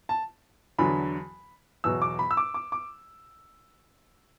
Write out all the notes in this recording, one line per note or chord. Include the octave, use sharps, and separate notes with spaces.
A5
E2 D3 F#3 B5
E2 B2 F#3 E6
D6
B5
E6
D6
D6
D6